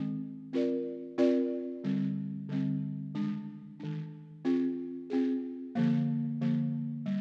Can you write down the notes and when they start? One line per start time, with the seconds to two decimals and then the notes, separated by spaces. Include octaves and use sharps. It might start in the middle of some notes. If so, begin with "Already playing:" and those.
Already playing: D#3 G#3 C4
0.53 C4 F4 A#4 D5
1.18 C4 F4 A#4 D5
1.84 D3 G3 C4
2.49 D3 G3 C4
3.15 D#3 G#3 D4
3.80 D#3 G#3 D4
4.45 C4 F4 G#4
5.10 C4 F4 G#4
5.75 D3 F3 A#3
6.41 D3 F3 A#3
7.06 G3